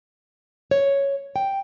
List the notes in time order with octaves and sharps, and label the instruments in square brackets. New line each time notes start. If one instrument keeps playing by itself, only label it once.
[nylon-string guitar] C#5
G5